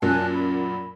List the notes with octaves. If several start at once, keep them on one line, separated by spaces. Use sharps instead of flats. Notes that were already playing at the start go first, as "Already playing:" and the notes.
F#2 A#2 F#3 G#5 A5 F#6
B5